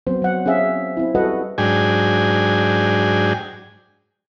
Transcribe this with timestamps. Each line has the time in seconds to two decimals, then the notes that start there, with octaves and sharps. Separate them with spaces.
0.07 F#3 B3 C4 C5
0.22 F#3 F#5
0.46 C4 C#4 G#4 E5 F5
0.97 C4 E4
1.15 G3 F#4 A4 B4 D#5 F#5
1.58 G#2 F#3 D4 G#4 G5 G#5